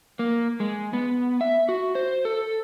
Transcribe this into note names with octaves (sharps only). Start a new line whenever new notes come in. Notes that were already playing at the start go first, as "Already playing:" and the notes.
A#3
G#3
B3
E5
F#4
C5
A4